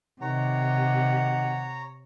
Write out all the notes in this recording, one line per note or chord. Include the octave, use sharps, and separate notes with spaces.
C3 D#3 G4 C#5 F#5 A#5